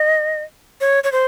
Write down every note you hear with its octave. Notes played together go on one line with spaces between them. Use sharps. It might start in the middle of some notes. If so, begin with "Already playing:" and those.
Already playing: D#5
C#5
C#5
C5